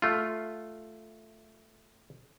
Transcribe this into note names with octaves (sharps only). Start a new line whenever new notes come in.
A3 F4